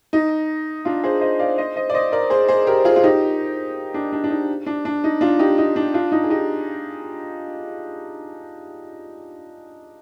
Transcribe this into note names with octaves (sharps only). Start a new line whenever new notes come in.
D#4
D4 F4
G#4 C5
C5 D#5
D5 F5
C5 D#5
C5 D#5
D5
C5 D#5
A#4 D5
G#4 C5
G#4 C5
G4 A#4
F4 G#4
F4
D#4 G4
D4
D4
D4
D#4
D4
D4
D#4
D4 F4
D#4 G4
D#4
D4
D4 F4
D#4
G#4
D#4 G4